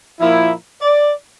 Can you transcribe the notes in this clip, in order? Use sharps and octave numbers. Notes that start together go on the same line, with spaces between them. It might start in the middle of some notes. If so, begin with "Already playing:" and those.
A#2 F3 A#3 E4
D5